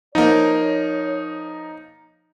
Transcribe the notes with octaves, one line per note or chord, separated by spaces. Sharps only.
F3 A#3 D#4 C#5